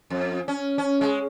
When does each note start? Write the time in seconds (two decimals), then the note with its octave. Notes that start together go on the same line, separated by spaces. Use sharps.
0.10 F2
0.48 C#4
0.78 C#4
1.01 G#3